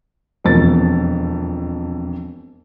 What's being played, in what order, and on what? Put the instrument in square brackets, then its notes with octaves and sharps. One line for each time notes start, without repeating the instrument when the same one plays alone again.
[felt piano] E1 F2 A6